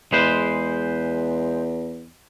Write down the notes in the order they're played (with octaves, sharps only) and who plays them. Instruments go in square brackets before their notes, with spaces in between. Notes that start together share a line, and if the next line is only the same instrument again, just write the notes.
[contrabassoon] E2 [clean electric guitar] G#3 B4 C5